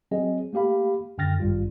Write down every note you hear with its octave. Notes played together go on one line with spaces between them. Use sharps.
F#3 C4 G#4 D#5
A3 A#3 G4 F5 B5
F#2 D3 G5 F6 A6 A#6
G#1 G2 G3 F4